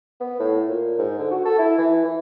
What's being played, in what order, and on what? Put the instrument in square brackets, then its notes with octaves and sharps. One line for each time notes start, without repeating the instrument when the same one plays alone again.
[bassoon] B3
A2
A#2
G#2
D3
F#4
A4
E4
E3
E3